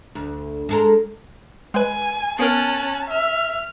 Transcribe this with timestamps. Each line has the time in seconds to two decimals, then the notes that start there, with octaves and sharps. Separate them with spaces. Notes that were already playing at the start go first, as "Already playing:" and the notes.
0.15 D2
0.69 G#3 A4 A#4
1.74 G#3 B4 G#5
2.39 B3 C#4 A#4 A5 F#6
3.10 E5 F6